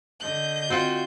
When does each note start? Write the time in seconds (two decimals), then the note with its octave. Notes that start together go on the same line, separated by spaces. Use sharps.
0.20 D3 D#5 G6
0.70 C4 F4 F#4